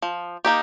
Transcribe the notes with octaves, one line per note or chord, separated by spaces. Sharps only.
F3
A#3 D#4 G4